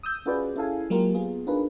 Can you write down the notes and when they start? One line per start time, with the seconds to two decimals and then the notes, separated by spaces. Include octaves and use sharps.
0.03 D#6 E6 G6
0.26 C#4 F4 F#4 G#4 B4 D5
0.56 C#4 E4 G#4 A4 F5 G#5
0.90 F#3 G#3 A#3 F4 G4 A#4
1.14 B3 F4 G#4
1.47 D4 D#4 F4 G#4 A#4 B4